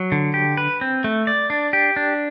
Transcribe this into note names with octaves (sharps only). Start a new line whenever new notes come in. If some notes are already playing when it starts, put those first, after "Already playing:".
Already playing: F#3
D3
G4
B4
C4
A3
D5
D4
G4
D4